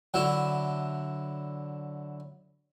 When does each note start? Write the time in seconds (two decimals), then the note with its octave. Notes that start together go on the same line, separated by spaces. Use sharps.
0.14 D3 F#3 E4